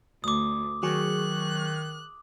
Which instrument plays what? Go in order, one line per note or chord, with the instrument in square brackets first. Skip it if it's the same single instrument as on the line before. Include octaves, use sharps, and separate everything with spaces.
[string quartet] D2 [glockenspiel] D6 D#6
[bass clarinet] D#3 [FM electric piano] F#3 G#4 C#6 [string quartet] F#6